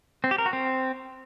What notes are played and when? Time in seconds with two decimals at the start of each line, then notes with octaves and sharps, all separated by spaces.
0.24 C4
0.31 G4
0.38 A#4
0.46 F#4
0.53 C4